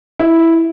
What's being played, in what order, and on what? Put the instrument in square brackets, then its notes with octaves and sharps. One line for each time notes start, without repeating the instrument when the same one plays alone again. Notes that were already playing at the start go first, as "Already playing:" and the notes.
[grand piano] E4